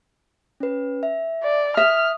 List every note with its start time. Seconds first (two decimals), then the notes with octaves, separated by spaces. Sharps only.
0.60 C#4 B4
1.03 E5
1.44 D5
1.77 E5 D#6 F6